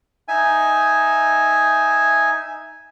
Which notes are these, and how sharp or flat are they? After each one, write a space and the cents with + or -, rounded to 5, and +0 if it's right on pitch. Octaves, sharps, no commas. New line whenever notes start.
D#4 +5 E5 +0 G#5 +0